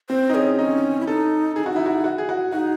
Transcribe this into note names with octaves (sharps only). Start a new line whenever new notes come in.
C4 C5
D#4
C#4 G#4
C#4 D#4
E4
D#4 A4
D#4 G#4
C#4 F#4
D#4 E4
F#4
F#4
G#4
F#4
D#4 F#4